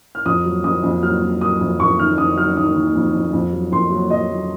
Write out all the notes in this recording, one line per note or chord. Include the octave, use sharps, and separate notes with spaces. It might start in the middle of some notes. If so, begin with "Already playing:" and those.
F6
F2 D#6
F#3
F2 D#6
F2
F#3 F6
F#3
F#3 D#6
F2
F2 C#6
D#3 F6
F2 D#6
F#3 F6
D#3 D#6
D#3
F2
F2
F2
F#3
F2 C6
F#3
F#3 D#5
F#3